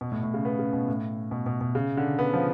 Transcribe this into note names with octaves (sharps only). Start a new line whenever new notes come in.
B2
A2
A2
C#3
B3
C#3
B2
A2
B2
B2
B2
C#3
D3
B3
F3